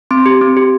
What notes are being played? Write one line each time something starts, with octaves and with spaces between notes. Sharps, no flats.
C4 C6
G4
C4
G4